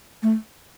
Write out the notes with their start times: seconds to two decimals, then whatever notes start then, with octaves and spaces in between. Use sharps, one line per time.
0.23 A3